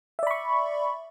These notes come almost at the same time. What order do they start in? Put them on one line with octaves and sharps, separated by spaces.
E5 D5 B5 C#6